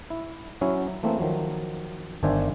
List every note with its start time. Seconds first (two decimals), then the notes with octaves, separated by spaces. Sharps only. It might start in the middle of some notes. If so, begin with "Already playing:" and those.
0.10 E4
0.61 F#3 C#4 E4
1.03 E3 A3 A#3 C4
1.20 D#3 F3 F#3
2.23 G1 D#3 D4 C5 E5 G#5